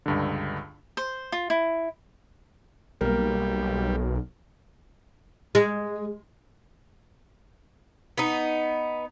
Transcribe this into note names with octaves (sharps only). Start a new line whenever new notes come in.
C#2 G2 D3
C5
F4
E4
B1 G3 A#3 A#4
G#3
B3 D#4